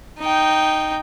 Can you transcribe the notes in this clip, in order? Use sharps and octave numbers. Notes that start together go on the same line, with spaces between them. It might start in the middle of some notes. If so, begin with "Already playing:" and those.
D#4 G5